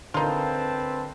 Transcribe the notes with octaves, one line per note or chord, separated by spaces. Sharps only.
D3 C4 D#4 F4 A#4 B4 A5 G6